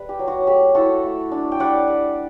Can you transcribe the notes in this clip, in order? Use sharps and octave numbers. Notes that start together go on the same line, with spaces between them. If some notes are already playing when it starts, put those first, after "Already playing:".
Already playing: G3 B4
G4
F#3
F#4
A3 G4
E4 F#4 A4
A3
D4
G5
G3 D5 F#5
G3